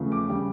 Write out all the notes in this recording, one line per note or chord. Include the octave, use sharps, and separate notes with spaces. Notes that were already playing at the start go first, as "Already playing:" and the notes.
Already playing: E2 C#3 F3 A3
D6
C#3 G3